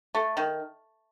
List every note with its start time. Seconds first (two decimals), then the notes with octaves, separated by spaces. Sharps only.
0.15 A3
0.37 D#3